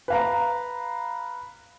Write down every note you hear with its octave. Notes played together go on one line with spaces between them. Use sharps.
B4 F5 A#5